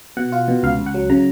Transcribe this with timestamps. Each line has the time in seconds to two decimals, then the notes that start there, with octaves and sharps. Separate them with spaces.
0.17 B2 F#5
0.32 F4
0.48 B2
0.63 C#2 F5
0.79 C#2
0.86 F#5
0.94 F#3
1.10 C#3 A#5